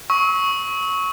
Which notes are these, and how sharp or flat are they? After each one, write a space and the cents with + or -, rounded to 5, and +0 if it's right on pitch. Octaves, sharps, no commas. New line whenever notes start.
C#6 +0 E6 -40